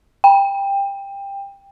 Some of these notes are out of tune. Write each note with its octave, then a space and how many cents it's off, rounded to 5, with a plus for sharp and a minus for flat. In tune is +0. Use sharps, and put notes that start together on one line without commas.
G5 +20